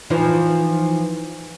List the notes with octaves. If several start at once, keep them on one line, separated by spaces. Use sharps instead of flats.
E3 F3 D#4